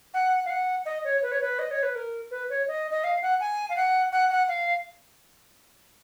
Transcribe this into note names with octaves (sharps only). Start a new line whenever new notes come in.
F#5
F5
F#5
D#5
C#5
B4
C#5
B4
D#5
C#5
B4
A#4
B4
C#5
D#5
D#5
F5
F#5
G#5
F5
F#5
F#5
F#5
F5